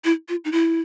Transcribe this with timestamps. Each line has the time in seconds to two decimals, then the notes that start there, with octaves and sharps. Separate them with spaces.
0.04 E4
0.29 F4
0.45 D#4
0.52 E4